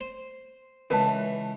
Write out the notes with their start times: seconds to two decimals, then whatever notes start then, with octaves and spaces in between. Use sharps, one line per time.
0.01 C5
0.90 C#2 E3 B4 E5 A5